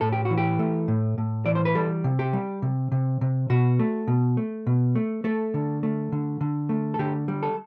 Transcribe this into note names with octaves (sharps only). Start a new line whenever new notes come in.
A2 A4
G4
F#4
E3
G4
A3
A2
A2
E3 D5
C5
B4
G3 A4
C3
G4
G3
C3
C3
C3
B2 F#4
A3
B2
A3
B2
A3
A3 A4
D3
A3
D3
D3
A3
A4
D3 G4
G3
A4